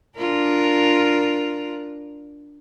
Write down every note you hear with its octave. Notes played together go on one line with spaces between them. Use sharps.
D4 F4 A#4